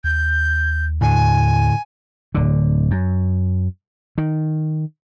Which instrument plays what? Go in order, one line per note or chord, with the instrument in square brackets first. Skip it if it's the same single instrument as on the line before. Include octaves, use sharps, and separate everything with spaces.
[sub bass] D#2 [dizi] G6
[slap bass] A2 D3 [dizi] G#5
[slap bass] D1 D3
F#2
D#3